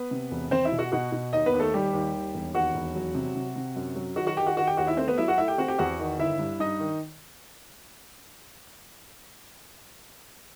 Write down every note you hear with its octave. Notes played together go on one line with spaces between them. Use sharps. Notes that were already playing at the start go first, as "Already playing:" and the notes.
Already playing: B3 B4
C3
E1
E1 C4 C5
E4 E5
B2
F#4 F#5
B2 F#4 F#5
B2
D#2 D#4 D#5
B3 B4
D#2
A3 A4
D#2 G3 G4
D#2
D#2
E1
D#2 F#4 F#5
E1
F#3
C3
C3
C3
F#2
F#3
D#3 F#4 F#5
F#4 F#5
D#3 G4 G5
F#4 F#5
D#3 F#4 F#5
G4 G5
D#2 F#4 F#5
E4 E5
A3 C4 C5
B3 B4
F#3 E4 E5
F#4 F#5
A3 E4 E5
G4 G5
C4 F#4 F#5
G4 G5
E2 F#4 F#5
D#3
G1 E4 E5
G2
G2 D#4 D#5
D#3